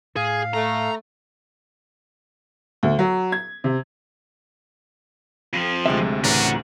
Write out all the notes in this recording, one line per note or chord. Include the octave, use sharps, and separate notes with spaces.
A2 G#4 F5
A3 A#5
D2
F#3
G#6
C3
F2 F3
D2 C3 G#3 E5
A2 C#3 E3 D4 F#4 A#4